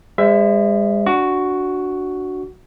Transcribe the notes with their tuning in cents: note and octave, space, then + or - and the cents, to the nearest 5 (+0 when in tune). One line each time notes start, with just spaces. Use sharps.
G#3 -35 C5 +0 E5 +15
D4 -5 F#4 +0 C#6 +35